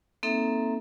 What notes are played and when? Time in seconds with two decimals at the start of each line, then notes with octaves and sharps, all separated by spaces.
0.23 A#3 C4 D#4 A4 E5 A#5